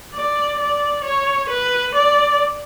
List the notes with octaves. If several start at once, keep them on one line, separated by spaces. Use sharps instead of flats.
D5
D5
C#5
B4
D5